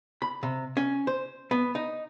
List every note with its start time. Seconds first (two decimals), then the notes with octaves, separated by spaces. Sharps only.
0.22 B5
0.43 C3
0.77 C#4
1.07 C5
1.51 B3
1.75 D#4